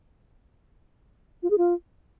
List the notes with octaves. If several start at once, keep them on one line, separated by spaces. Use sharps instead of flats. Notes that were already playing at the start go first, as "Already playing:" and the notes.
F4
G#4
F4